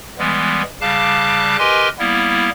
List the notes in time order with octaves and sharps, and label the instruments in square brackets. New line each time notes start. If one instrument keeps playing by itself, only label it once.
[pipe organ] E3 G3 G#3 B3
C#3 G3 F5 A5 D6 F#6
G4 A#4 B4 D#5 G#5 C6
G3 A#3 B3 E4